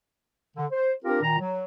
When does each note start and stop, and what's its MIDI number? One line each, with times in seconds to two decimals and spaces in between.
0.56 0.65 50
0.71 0.92 72
1.05 1.21 60
1.05 1.21 62
1.05 1.21 65
1.05 1.21 67
1.05 1.21 70
1.22 1.35 46
1.22 1.35 51
1.22 1.35 82
1.39 1.64 54